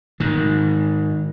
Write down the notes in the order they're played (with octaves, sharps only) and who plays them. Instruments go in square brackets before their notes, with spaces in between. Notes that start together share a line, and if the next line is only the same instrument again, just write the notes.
[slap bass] G#2 D#3